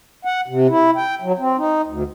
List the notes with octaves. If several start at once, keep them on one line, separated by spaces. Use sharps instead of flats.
F#5
C3
E4
G5
F#3
C4
D#4
D2